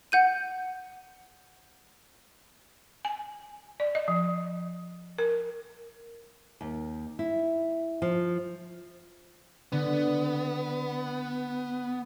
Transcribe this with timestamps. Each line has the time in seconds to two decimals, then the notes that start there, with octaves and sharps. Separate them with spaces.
0.12 F#5 G6 D#7
3.05 G#5
3.80 D5
3.95 D#5
4.08 F3
5.18 A#4
6.61 D#2
7.19 E4
8.02 F3
9.72 D3 B3